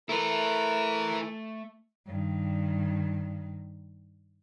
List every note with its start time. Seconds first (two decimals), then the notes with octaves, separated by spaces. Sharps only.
0.09 A3 E4 A#4 B4
2.07 G2 D#3